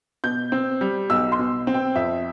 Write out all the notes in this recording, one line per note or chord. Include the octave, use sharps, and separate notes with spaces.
B2 G6
C4
G3
B1 E6
C6
B2
C4
G5
F2 E5